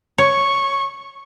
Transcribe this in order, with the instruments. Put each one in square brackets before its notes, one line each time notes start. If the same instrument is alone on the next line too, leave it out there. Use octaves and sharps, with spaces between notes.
[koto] C#5 [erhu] C#6